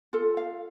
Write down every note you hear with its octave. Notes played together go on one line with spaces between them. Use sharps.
F4 A4
F5